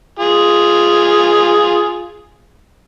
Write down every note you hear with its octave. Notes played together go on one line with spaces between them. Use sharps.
F4 G#4